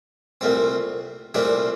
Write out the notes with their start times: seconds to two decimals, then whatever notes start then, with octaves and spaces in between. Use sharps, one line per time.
0.41 C2 A#2 A3 C4
1.34 C2 A#2 A3 C4 D4